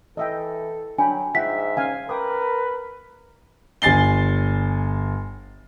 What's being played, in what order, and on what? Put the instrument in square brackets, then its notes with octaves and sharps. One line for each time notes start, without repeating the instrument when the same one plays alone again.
[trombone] E3 [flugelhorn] A4 [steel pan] D#5 E5 G5
[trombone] F#3 [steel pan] D4 G5 B5 [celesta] G#5
[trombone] G#2 [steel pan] F4 F#5 G5 [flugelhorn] E5 [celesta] B6
[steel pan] C#4 F5 G#5
[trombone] A#4 [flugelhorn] B4 [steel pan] G5 D6 D#6
[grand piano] G1 G#5 A6 C7 G7